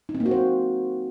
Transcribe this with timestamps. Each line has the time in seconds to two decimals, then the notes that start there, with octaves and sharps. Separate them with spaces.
0.09 D#4
0.15 C4
0.20 A#3
0.26 F#4
0.31 C5